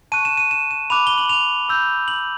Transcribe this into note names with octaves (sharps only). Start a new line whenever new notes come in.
A5 C#6 F#6 D#7
E7
D#7
E7
E7
B5 D6 F#6 F7
G7
F#7
F7
B5 E6 G6
F#7